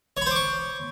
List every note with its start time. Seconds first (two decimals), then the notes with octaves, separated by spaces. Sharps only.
0.17 C#5
0.21 B5
0.26 C5
0.31 D6
0.36 C#6